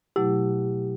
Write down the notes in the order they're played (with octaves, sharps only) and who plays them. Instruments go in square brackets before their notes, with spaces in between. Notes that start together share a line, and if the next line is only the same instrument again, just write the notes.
[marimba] B2 F#3 A3 E4 [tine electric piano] G4